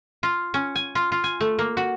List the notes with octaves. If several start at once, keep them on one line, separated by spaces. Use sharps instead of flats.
F4
C#4
G#5
F4
F4
G#5
A3
A#3
F#4